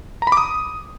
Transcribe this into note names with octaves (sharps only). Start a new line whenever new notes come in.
A#5
B5
D6
D#6